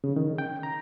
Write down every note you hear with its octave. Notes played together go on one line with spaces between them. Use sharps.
C#3
D#3
G5
A#5